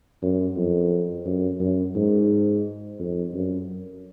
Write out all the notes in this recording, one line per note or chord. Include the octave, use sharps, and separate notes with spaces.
F#2
F2
F#2
F#2
G#2
F2
F#2